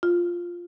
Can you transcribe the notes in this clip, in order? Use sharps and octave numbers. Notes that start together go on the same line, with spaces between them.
F4